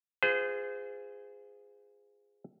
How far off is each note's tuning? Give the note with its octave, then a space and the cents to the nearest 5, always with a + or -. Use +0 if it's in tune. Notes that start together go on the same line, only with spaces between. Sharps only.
F4 +0 G#4 -10 C5 -35